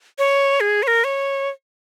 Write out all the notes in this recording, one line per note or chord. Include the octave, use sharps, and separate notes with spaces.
C#5
G#4
C#5
A#4
C#5